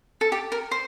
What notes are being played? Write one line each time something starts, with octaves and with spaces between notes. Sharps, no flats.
A4
G4
A#4
C5